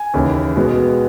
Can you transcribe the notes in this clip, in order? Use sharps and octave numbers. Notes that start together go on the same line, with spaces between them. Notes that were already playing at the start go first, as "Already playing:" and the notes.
Already playing: G#5
D#2 C#3 E3
B2 G#3 B3